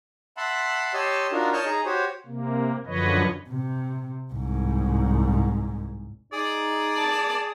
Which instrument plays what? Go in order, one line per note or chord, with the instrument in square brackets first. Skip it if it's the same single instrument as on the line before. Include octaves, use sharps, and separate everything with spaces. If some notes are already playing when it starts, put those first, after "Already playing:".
[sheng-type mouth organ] E5 F#5 A5 B5 C6
G4 C#5 D#5 A5 C6 E6
D4 D#4 F4 F#4 A#4
C#5 D#5 A5 C#6 F6 G6
D#4 G#4 A#5
F#4 G4 C5 C#5
[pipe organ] C3 A#3
F#2 D3 F3 B4 C#5 D#5
[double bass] C3
C2 G#2
[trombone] D#4 [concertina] G#4 D#6 [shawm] D5
[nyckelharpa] A5